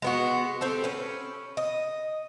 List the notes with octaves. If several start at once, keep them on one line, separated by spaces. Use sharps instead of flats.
G#3 B3 F#4
C4 G4 A4
C#4 B4
D#5